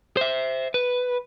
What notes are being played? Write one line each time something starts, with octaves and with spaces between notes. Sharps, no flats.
C5 E5
B4